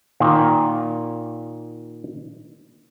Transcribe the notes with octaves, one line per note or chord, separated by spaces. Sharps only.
A#2 D#3 F5